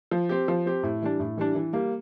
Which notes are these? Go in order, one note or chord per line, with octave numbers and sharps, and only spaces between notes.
F3
C4 G4
F3
C4 G4
A2
E3 G3 D4
A2
E3 G3 D4
E3
G3 A#3